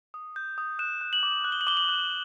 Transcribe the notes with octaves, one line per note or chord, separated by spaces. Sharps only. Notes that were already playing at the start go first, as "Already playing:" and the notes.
D#6
G6
D#6
F#6 E7
F#6
F#7
D6
F#6
G7
F#7
D6 G7
F#7
F#6